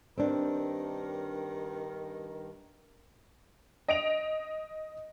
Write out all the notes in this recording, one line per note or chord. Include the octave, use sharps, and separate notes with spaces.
G2 D#3 C4 D4 A#4
D#5 D7 F7